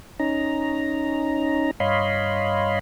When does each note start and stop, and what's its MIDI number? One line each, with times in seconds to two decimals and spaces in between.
0.19 1.71 61
0.19 1.71 63
0.19 1.71 82
1.80 2.79 43
1.80 2.79 73
1.80 2.79 75
1.80 2.79 77
1.80 2.79 83
1.80 2.79 84